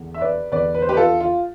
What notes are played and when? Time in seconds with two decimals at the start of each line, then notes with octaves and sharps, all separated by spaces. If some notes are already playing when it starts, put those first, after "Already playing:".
Already playing: E2 D3
0.14 E5
0.21 B4 D5
0.52 E2 D3 B4 D5
0.75 B4
0.82 C5
0.89 G4 B4
0.97 F4 A4
1.20 F4